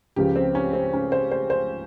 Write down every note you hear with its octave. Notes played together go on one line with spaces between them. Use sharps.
C#2 C#3 F3 G4
C4
C#4
C4
C#4
C5
C5
C5